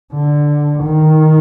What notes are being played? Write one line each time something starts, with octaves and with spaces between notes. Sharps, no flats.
D3
D#3